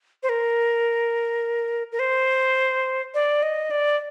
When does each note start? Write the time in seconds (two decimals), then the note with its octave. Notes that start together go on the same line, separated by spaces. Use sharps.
0.23 C5
0.29 A#4
1.92 A#4
1.99 C5
3.14 D5
3.43 D#5
3.71 D5